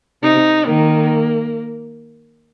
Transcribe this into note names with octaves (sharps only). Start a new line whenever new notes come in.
C3 D#4
D#3 A#3